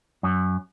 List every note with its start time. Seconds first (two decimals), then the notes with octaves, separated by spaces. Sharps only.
0.23 F#2